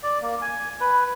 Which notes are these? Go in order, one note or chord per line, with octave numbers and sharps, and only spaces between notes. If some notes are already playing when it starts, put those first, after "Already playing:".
D5
A#3
G#5
B4